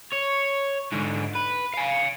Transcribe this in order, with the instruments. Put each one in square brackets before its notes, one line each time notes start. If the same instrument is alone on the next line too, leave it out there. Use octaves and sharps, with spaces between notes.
[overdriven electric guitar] C#5
G#2 D3
B4
F5 G#5